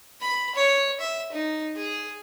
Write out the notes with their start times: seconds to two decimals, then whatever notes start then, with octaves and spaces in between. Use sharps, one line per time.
0.21 B5
0.55 C#5
1.01 E5
1.32 D#4
1.76 G#4